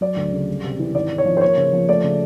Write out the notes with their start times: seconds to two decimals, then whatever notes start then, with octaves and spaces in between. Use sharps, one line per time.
0.01 F#3 D5
0.17 D2
0.32 C#3
0.48 G3
0.64 C3
0.79 E3
0.95 G#1 D5
1.10 G#2
1.18 C#5
1.26 F3
1.37 C5
1.41 A#3 C#5
1.57 C#3
1.73 F3
1.89 A3 D5
2.04 C#3